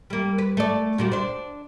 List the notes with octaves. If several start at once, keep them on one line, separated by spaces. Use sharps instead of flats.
G3 A#3
B4
A3 D5
A#2 G3 F#4
D4 C5